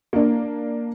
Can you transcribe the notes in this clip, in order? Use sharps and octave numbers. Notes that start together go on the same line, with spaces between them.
A#3 D4